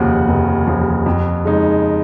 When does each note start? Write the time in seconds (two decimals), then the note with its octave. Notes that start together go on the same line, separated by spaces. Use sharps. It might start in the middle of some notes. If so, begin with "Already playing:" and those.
Already playing: F1 D#2 C#3 F3 F#4
0.28 F1
0.67 D#2 C#3 F3
1.06 F2
1.45 C#3 G#3 D#4